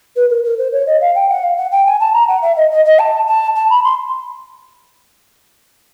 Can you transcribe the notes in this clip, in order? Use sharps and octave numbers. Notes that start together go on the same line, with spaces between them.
B4
A#4
A#4
C5
C#5
D#5
F5
G5
F#5
F5
F#5
G5
G#5
A5
A#5
F#5
E5
D#5
D#5
D#5
A5
A5
A5
B5
C6